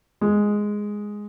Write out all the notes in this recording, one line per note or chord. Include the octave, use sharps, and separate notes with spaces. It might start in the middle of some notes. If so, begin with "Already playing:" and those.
G#3